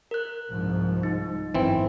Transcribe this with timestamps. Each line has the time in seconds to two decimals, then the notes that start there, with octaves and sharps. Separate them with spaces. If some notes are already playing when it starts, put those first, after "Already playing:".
0.11 A#4 F#6
0.50 C2 G#2 F3
1.03 D#4
1.55 G#1 F#2 E3 C4